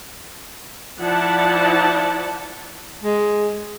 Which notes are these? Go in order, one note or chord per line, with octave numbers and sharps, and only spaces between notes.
F3 E4 D5 F#5 A5
G#3